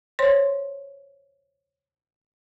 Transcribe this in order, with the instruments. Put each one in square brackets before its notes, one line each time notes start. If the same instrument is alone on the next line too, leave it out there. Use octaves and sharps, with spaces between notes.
[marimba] C5 C#5 C6